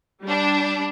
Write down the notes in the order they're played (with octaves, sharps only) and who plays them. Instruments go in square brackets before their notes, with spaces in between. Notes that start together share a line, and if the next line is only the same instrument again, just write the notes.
[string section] G3 D4